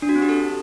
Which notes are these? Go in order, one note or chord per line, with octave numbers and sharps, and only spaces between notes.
D4
F#4
C4
G4
A4